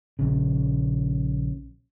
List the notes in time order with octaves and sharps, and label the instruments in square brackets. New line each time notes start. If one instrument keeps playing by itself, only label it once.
[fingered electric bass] A#1 C#3